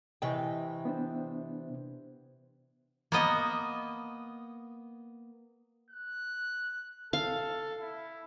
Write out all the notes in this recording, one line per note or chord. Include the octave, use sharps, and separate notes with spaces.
C3 E3 D#5 G5 G#5 C#6
B3 D4 C5
A#3 B3 D#5
F#6
A4 F5
E4